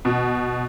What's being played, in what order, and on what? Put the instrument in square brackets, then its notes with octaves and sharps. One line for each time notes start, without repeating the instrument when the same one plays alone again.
[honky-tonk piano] B2